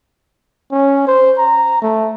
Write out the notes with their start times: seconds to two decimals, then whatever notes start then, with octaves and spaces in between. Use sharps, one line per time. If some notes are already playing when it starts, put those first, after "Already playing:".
0.72 C#4
1.07 C5
1.38 A#5
1.82 A3